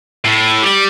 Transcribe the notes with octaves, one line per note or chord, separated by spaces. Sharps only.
A2
G3